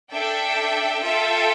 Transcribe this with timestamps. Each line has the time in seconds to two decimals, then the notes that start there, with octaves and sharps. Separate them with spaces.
0.12 D4 A4 E5 G5
1.03 F4 A4 E5 G5